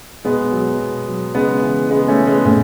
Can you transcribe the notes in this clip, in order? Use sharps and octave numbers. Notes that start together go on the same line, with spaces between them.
B2 G#3 B3
F#3
B2
F#3
C#3 G#3 B3
E3
C#3 G#3 B3
A3 C#4
E3
G#3 B3
A2 A3 C#4